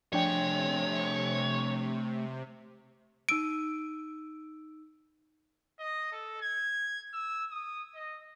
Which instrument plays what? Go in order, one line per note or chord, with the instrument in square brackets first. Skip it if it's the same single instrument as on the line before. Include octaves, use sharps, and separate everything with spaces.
[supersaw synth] C3 [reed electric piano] F3 D4 G5 [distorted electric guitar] A3 G#4 [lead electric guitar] C#5
[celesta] D#4 E6 D#7 [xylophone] D7
[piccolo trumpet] D#5
A4
G#6
E6
D#6
D#5